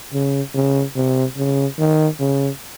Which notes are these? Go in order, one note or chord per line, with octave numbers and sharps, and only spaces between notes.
C#3
C#3
C3
C#3
D#3
C#3